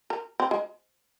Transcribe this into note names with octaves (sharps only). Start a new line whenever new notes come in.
A#4
C4
G#3